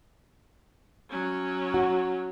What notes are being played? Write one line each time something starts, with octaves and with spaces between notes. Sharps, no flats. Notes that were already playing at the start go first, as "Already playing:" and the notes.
F#3 C#4
F#4